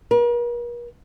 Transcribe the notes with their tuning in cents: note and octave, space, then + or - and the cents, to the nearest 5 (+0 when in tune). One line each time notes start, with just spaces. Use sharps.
A#4 +45